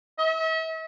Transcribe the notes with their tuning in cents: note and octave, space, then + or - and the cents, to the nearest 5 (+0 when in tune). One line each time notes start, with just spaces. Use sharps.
E5 -40